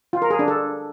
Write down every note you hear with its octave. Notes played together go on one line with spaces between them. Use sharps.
F4
A#4
G#4
D4
A4